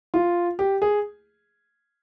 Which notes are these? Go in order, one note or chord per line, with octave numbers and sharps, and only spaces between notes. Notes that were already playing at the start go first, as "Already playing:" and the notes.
F4
G4
G#4